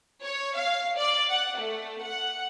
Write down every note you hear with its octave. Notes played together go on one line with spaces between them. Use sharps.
C#5
F5
D5
F#5
A3
F#5